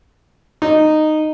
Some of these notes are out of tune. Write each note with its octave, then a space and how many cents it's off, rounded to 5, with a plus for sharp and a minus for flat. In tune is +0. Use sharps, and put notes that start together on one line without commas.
D#4 -10